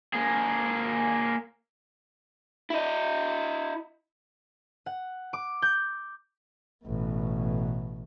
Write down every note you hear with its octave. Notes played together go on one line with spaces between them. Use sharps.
A#3 G#4
E4 D#5
F#5
D6
G6
A1 B2